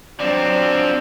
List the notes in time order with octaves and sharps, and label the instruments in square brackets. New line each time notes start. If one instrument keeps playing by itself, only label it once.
[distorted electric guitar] F3 C4 [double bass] F#3 D4 [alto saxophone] D5